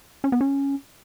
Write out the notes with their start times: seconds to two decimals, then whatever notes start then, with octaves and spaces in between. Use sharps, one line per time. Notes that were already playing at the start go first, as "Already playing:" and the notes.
0.24 C#4
0.32 B3
0.41 C#4